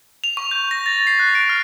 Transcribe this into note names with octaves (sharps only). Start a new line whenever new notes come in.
F7
C#6
G6
A#6
A6
C7
F#6
D7
F6